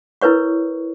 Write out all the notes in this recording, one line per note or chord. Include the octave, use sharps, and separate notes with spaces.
E4 A#4 B4 C#5 C#6